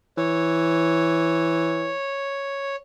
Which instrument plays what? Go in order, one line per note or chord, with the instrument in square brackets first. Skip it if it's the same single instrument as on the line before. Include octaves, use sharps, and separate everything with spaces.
[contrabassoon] E3 [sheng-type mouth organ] C#5